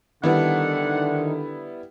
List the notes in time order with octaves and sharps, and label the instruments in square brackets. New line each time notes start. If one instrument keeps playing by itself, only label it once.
[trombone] D3 [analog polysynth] D#3 [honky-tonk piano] G3 B3 E4 [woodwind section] D4 F#5